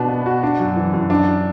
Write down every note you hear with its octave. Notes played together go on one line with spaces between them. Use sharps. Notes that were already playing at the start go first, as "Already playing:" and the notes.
Already playing: B2 D4
B3
F#4
D4
F#2
E3
F#2
D4